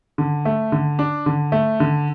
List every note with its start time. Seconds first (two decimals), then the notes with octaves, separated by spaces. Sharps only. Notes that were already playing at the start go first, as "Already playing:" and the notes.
0.18 D3
0.45 A3
0.72 D3
0.99 D4
1.26 D3
1.52 A3
1.80 D3